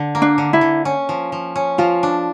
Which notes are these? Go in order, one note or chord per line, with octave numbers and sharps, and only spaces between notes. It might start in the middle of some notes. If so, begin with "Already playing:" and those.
Already playing: D3
A#3
D4
D3
E4
D3
C#4
F3
F3
C#4
F3 F4
D4